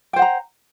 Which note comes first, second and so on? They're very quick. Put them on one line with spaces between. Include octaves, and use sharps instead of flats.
G5 C5 F#5 A#5